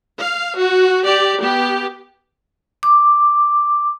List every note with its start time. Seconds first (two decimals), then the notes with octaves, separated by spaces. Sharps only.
0.19 F5
0.57 F#4
1.04 G4 D5
1.39 B3 G4
2.83 D6